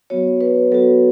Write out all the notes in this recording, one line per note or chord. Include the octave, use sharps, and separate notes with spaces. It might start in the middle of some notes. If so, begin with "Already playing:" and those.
F#3 B3 F#4 C#5
B4
F#3 B3 F#4 A4